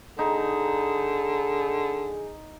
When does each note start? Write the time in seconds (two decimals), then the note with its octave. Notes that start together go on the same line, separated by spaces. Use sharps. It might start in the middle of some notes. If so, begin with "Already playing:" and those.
0.19 D3 D#4 G#4